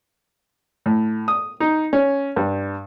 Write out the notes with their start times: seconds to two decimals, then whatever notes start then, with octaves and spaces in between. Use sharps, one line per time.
0.86 A2
1.28 D#6
1.60 D#4
1.93 C#4
2.36 G2